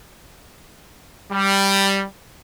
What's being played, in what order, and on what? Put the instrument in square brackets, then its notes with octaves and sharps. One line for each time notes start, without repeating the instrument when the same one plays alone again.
[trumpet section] G3